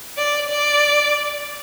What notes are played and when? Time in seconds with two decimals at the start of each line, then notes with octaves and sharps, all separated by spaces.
0.18 D5
0.49 D5